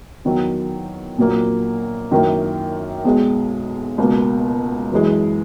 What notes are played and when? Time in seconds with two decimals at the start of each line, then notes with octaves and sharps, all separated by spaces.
0.25 E2 D#3 F#3
1.18 A#1 A#2 F#3 A#3
2.11 F#2 D#3 A#3 E4
3.05 B1 B2 G#3
3.98 C#2 B2 A#3
4.92 F#2 E3 G#3